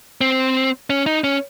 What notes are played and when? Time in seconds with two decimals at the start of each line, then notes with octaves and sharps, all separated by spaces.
0.21 C4
0.90 C#4
1.06 D#4
1.24 C#4